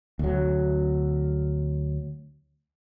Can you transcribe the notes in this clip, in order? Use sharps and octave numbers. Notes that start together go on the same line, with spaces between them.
D2 F#3